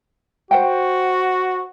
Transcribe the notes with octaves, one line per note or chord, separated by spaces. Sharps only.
F#4 C5 F#5 G5